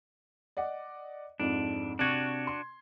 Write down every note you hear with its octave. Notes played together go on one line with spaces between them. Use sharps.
D5 D#5 F#5
F2 G#2 D4
C3 D4 F#4 C#6 G#6
C6